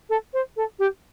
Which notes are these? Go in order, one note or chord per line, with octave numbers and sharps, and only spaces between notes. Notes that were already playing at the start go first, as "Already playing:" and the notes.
A4
C5
A4
G4